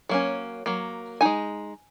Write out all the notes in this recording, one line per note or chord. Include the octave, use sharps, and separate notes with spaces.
F#3 A#3 C#4
F#3 A#3
G#3 D#4 G#5